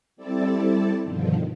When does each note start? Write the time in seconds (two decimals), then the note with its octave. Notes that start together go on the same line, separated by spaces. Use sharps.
0.16 G3 C4 E4 A4 D5 A5
1.03 G2 B2 D3 D#3 F3